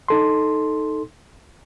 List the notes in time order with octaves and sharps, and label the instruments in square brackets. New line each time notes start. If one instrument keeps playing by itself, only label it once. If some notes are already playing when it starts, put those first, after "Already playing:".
[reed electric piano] D#4 A4 C6